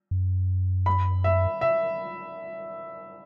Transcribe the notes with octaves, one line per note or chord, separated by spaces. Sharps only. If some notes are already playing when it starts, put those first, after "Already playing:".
F#2
B5
E5
E5